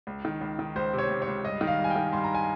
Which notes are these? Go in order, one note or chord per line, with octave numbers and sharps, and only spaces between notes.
C#2
D#3
C#2
D#3
C#2 C5
C3
C#5
C#2
C#5
C#2
G2 D#5
D#3
F5
G2
G#5
G5
D#3
G2 C6
A#5
G#5